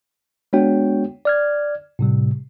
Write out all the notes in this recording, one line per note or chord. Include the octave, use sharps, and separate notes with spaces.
G#3 B3 D4 F#4 C#5 G5
D5 F6 G#6
A2 C3 G3